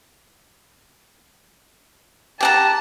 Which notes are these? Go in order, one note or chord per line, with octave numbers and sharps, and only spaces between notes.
G4 F#5 A5 A#5